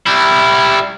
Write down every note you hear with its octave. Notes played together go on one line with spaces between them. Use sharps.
G3 E4